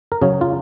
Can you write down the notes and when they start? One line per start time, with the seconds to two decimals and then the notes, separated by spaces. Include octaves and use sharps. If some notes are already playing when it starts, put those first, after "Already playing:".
0.12 A#4
0.21 C#3 F#3 C#4 G#4
0.41 F4